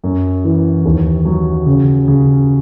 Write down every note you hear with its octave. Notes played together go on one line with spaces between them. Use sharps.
F#2
E3
D#2
F#3
C#3
C#3